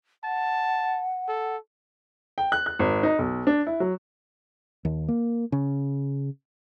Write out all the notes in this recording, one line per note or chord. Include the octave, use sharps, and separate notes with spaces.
F#5 A5
A4
G5
F#6
F#6
G#1
D#4
B1
D4
E4
F#3
D#2
A#3
C#3